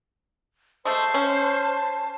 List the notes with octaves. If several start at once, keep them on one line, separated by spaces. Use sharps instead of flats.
G#3 A3 C5 A5
C#4